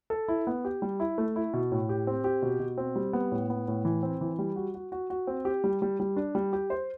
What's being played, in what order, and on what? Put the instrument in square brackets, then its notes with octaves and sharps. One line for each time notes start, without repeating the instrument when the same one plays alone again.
[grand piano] A4
E4
B3
G4
G3
E4
A3
E4
B2
A2
G4
C4
G4
B2
B2
C4
G3
B3
A2
B3
A2
E3
C4
E3
G3
F#4
F#4
F#4
F#4
C4
G4
G3
G3
G3
D4
G3
G4
C5